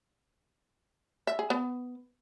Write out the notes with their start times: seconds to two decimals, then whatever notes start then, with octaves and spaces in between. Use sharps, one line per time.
1.27 E5
1.39 G#4
1.50 B3